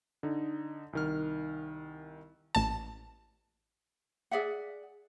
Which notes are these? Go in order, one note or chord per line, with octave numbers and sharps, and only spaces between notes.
D3 D#4
C2 D#3 F6
A1 A5
G#4 D5 E5 F#5